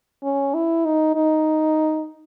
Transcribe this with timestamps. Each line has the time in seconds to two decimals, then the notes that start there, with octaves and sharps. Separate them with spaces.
0.23 C#4
0.54 E4
0.85 D#4
1.15 D#4